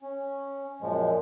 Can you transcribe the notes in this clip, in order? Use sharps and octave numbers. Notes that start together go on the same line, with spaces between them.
C#4
F#2 A#2 F3 G#3